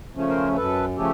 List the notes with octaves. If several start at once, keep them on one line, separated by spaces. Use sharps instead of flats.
C#3 F3 A3 C#4
A#4 C5
F#2 A4 B4
C#3 F3 A3 C#4 G4 A4